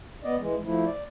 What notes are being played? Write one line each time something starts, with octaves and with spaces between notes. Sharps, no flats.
B3 D5 D#5
E3 G#3
F3 A3 E4
D5